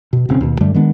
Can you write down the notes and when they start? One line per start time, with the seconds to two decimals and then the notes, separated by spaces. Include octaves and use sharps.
0.13 B2
0.29 E1 C#3 C4 C#4
0.41 D#2 B2
0.61 G2 D3 G3 A3
0.74 D#3 G#3 B3 D4